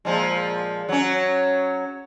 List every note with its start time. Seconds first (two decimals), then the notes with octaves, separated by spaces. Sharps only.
0.05 A#2 F3 G#3
0.89 F#3 C#4